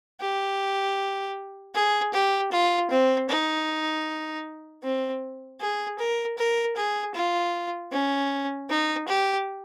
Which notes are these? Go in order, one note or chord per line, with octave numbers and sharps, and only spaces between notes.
G4
G#4
G4
F4
C4
D#4
C4
G#4
A#4
A#4
G#4
F4
C#4
D#4
G4